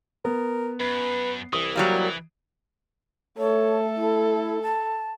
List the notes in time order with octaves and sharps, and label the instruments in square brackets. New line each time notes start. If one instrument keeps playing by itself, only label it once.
[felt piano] B3 [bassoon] A#4
[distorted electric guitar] F#2 [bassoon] B4
[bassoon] C2 [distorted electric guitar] E3 [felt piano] D#6
[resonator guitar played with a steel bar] F#3 G3 A#3
[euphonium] A3 [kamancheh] A4 [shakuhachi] C#5
[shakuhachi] E4
A5